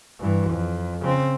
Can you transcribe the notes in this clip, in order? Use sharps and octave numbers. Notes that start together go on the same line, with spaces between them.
G2 E3
F2
C#3 C4